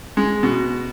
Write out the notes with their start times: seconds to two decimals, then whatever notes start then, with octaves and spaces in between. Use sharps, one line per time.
0.17 G#3
0.43 B2